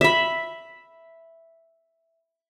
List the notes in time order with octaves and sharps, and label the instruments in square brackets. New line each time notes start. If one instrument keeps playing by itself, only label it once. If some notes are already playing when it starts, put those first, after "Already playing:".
[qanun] E5 B5